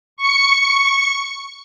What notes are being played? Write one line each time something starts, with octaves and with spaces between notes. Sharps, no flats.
C#6 C#7